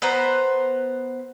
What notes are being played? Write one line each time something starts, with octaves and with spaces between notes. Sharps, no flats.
B3 B4 C5 A#5